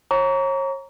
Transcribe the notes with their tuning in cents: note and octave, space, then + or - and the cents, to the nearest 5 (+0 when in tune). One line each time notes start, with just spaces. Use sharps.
C#5 -30 A#5 +0 C#6 +45